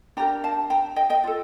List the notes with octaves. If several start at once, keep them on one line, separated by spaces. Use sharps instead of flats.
D4 G4 A#4 G5 A#5
F5 A5
G5 A#5
D#5 G5
D#5 G5
F4 A4